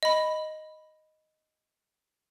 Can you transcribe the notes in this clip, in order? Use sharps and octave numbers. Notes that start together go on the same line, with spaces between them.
D#5 B5